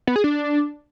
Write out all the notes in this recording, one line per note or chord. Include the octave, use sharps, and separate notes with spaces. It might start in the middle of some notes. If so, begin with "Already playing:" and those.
B3
G#4
D4